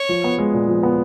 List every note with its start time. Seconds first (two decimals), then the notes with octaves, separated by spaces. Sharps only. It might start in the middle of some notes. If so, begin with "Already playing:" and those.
Already playing: C#5
0.09 F3
0.24 B3
0.38 G#3
0.54 A#2
0.68 F3
0.83 B3